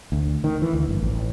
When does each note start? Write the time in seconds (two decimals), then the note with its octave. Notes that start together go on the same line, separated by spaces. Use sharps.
0.12 D2
0.44 D#3
0.62 E3
0.73 D2
0.89 G1
1.02 A1